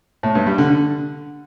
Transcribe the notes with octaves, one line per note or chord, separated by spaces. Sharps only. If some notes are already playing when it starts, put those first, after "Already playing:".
A2
G2
G3
D3
D3